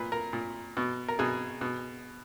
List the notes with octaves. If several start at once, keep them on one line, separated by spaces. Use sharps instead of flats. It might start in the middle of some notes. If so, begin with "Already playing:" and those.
Already playing: A#2 B4
A#4
A#2
B2
A#4
B2 G#4
B2